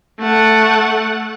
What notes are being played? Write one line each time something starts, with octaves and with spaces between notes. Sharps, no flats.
A3 F#5